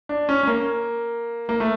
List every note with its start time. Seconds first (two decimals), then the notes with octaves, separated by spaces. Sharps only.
0.09 D4
0.29 C#4
0.43 C#4
0.47 A#3
1.49 A#3
1.60 A3